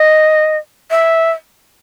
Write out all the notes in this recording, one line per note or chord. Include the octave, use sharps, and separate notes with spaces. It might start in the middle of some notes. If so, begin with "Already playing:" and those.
Already playing: D#5
E5